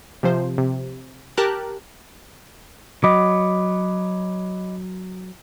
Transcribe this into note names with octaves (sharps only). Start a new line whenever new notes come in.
C3 F3 C5
C3
G4 A#4 A5 A#5 F#6
F#3 D#5 B5 D6